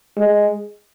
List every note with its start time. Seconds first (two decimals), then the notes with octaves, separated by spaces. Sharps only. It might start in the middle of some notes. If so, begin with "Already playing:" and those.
0.18 G#3